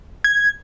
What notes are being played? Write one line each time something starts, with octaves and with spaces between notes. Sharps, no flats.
G#6